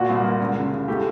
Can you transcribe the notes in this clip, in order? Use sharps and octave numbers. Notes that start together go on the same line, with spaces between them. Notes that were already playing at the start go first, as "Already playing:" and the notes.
Already playing: A#2 F#4
C2
A#3
C#2
C#3
C#3
A2 G4